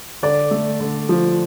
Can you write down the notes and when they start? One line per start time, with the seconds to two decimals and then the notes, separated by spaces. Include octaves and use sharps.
0.23 D3 D5
0.51 A3
0.80 D3
1.09 F3